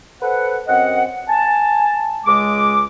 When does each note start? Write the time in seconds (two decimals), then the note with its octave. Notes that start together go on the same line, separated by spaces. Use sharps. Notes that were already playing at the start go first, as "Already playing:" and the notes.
0.22 A4 B4 C5 F#5
0.68 F#2 C4 D#5 F#5
1.29 G#5 A5
2.26 C#2 G#3 D6